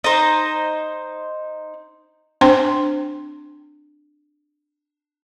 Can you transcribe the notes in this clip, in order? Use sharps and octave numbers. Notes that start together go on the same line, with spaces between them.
D#4 C5
C4 D4 C5 G5 C6